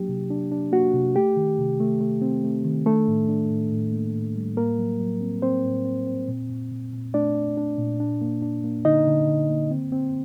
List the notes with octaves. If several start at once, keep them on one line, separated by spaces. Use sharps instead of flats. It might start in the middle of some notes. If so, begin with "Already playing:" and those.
Already playing: F#3 A#3 D4 G4
C3
D4
D4
A#3 F#4
C3
A3 G4
D#3
C3
A3
A3
C4
A3
D#3
A3 D4 A4
A2
D4
A2
A2
A#3
A2
G3
A2 A#3 A#4
F#3
F#3
C4
C4 C5
A2
C4
C4
A#2
A#2
A#2
A#2
A3 D4 D5
D4
D4
A#2
D4
A#3
D4
A#3
D3 D#4 D#5
D3
D3
A#3
C4
C4